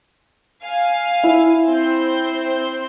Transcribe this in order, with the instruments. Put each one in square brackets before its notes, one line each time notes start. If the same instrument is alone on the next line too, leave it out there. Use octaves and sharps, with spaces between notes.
[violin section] F5 G#5
[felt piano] E4
[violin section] C4 C5 G6